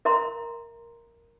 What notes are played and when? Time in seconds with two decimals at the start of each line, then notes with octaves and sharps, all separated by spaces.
0.05 A#4 E5 A#5 C6